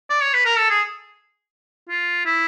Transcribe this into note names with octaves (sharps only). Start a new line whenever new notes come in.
D5
C#5
B4
A#4
A4
G#4
F4
E4